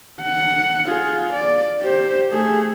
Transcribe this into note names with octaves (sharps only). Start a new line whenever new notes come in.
F#5
F4 G#4
D5
G4 C5
A3 G#4